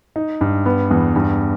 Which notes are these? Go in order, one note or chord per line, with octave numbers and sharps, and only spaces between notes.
D#4
G2
B3
E2
G2